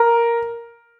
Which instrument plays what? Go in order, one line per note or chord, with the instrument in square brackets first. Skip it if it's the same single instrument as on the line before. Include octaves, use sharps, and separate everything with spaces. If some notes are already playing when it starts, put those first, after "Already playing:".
Already playing: [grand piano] A#4